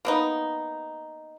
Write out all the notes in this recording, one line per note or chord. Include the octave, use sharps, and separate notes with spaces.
A#3 B3 D#4